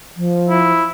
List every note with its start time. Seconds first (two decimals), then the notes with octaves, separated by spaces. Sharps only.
0.16 F3
0.49 E4